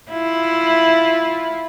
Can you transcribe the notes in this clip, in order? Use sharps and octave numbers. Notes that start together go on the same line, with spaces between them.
E4 F4